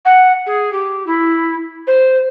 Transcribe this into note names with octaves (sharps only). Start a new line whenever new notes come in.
F#5
G#4
G4
E4
C5